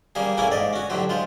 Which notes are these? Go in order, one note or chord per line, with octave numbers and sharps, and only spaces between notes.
C#3 G3 A#3 G#4
A2 C#3 A#3 C#4 E4 G#4
G#2 D5 D#5
C#4 F#4
A2 D3 F#3 G4 C5
G#3 F4 C5